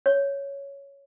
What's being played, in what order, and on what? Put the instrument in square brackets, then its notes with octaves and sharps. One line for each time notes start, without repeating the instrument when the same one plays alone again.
[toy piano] C#5